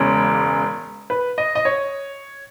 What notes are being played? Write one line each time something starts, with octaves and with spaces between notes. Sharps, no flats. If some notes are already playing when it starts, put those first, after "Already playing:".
Already playing: E1 E2 C#3 G#3 C#5
B4
D#5
D#5
C#5